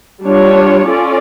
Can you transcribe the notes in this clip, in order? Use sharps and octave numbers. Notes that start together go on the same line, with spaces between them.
G3 D4 F4 C#5
C#4 F4 A4 D5